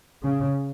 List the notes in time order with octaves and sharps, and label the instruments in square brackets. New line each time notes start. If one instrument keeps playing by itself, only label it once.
[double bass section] C#3